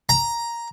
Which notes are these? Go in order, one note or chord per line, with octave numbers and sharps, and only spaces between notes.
A#5